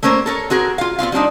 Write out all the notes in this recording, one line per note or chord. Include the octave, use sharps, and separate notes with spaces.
A3 A#3 C#4 A#4 C5
A4 A#4 C#5
C4 F#4 G#4 A#4
F4 F5
B3 C4 F4 F5
G3 C4 D4 D#4